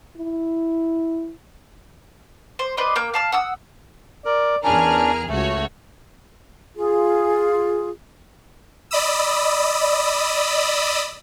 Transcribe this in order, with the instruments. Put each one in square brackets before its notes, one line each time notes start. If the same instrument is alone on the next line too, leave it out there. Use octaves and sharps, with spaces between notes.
[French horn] E4
[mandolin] C5
B4 C5 D5 D#5
A#3 G5
F5 A5 F6
F#5 D#6 E6
[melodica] A#4 [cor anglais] D5
[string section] E2 G#4 F6 [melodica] C#4 D4 [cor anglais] A#4
[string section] C#2 F#4 C#5 [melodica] A3
[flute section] F4 G#4
[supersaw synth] D5 D#5 B5 D#6 E6